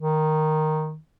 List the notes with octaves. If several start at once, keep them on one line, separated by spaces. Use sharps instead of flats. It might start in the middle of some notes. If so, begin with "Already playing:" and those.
D#3